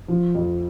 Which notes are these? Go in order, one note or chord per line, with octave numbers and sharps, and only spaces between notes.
F3
F2